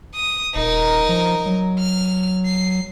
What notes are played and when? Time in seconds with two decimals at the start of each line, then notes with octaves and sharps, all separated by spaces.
0.15 D#6
0.55 D#1 D#4 A#4
1.09 F3
1.46 F#3
1.79 F6
2.46 C7